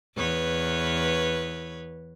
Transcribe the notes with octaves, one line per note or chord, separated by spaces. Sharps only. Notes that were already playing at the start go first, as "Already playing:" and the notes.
E2 B4 C#5